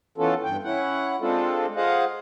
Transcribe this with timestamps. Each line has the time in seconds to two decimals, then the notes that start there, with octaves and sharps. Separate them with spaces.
0.18 E3 B3 C#4 F4 A4
0.43 G2 G5
0.64 C#4 E4 F#5
1.21 G#3 C4 D4 F4 A4
1.76 F4 G#4 C5 D#5 F5 F#5